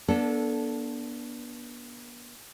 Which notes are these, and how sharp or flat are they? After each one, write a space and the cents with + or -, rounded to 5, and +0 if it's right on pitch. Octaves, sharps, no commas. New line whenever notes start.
B3 -45 D4 -15 A4 +0